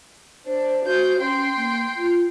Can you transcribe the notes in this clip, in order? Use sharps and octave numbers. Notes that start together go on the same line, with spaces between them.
D4 C5
F#4 C5 G6
C#4 G5 C6
A#3
F4